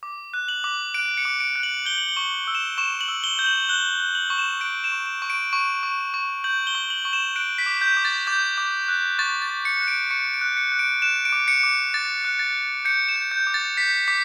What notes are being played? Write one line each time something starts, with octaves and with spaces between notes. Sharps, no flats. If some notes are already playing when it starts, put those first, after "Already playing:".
D6
F#6
F#7
D6
F#6 D7
C#7
D6
D7
F#6
F#7
G6 G7
F#7
G7
C#6
E6
E7
C#6 E7
F#7
E6
G7
G6
F#7
F#6 G7
F#6
F#7
C#6
E7
F#6 D7
E7
C#6
E7
C#6
D7
C#6
C#6
C#6
G6 F#7
G7
C#6
F#7
C#6
E7
F#6 D7
B6
D6
G6
D6
A6
D6 G6
D6
F#6
C#6 A6
A6
C#6
C#7
F#6
D7
C#6 C#7
D7
F#6
C#7
F#6
D7
F#6 E7
D7
D6
C#7
D6
D6 A6
F#6
A6
F#6
G6 C#7
E7
G6
G6
D6
A6
G6 B6
D6 B6